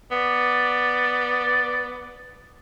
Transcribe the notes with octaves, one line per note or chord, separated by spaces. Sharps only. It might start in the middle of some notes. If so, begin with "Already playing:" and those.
B3 D5